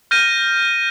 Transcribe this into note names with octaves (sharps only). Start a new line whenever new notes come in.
F6 G6 A#6 D#7